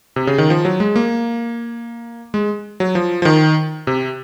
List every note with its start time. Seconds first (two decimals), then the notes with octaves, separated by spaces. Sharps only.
0.16 C3
0.27 C#3
0.38 D#3
0.50 F3
0.65 F#3
0.80 G#3
0.96 A#3
2.34 G#3
2.80 F#3
2.95 F3
3.22 F3
3.25 D#3
3.87 C3